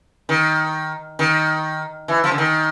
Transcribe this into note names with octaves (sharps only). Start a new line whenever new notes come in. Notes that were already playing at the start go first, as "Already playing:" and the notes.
D#3
D#3
E3
F3
D3
D#3